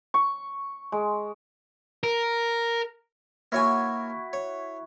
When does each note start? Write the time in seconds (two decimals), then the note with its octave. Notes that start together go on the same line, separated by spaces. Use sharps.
0.14 C#6
0.92 G#3
2.03 A#4
3.52 A#3 E4 F#4 C#5 G#5
4.33 C#5